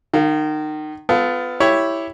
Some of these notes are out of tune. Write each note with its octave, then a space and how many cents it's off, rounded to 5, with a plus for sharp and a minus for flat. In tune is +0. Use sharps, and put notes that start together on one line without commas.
D#3 -25 F5 +10
B3 +25 F4 +0 A4 +0
E4 +0 G4 +0 C#5 +0